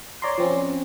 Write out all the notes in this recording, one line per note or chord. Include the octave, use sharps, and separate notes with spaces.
C#5 D5 A#5 C6
F3 C4 C#4